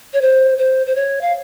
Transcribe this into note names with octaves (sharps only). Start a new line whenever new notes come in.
C#5
C5
C5
C5
C#5
F5